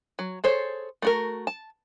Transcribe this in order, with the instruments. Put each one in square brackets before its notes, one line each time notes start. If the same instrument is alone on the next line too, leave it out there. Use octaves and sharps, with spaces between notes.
[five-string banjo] F#3
G#4 A4 C5 C#5
A3 F#4 A#4
A5